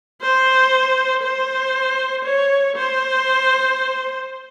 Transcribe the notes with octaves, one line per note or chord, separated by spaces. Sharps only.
C5
C5
C#5
C5